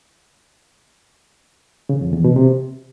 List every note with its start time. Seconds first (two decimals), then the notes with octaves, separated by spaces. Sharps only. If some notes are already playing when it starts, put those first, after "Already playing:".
1.89 C#3
2.01 F2
2.13 E2
2.24 B2
2.36 C3